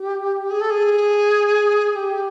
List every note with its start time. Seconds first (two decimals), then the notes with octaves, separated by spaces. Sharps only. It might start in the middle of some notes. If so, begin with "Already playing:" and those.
Already playing: G4
0.51 G#4
0.61 A4
0.70 G#4
1.90 G#4
1.95 G4